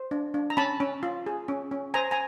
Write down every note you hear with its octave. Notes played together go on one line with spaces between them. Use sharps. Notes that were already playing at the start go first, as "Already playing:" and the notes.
Already playing: C5
D4
D4
A#5
C#4 A5 B5
C#4
F4
G#4
C#4
C#4
C5 G#5 A#5
G#5 A#5